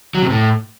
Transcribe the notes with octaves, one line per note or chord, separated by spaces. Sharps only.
F#3
C3
A2